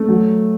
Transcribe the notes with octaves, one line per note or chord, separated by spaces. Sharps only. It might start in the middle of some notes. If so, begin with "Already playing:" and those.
Already playing: A3
F#3